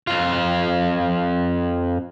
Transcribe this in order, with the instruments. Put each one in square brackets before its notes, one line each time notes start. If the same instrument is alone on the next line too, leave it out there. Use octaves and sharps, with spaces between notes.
[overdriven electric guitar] F2 F4